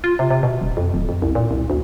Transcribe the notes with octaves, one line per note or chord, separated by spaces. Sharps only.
F4
C3
C3
B2
D#1
F2
D1
F2
C2
A#2
C2
D2